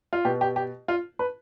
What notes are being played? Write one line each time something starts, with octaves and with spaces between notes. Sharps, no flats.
F4
B2 B3 G4
G4
G4
F4
B4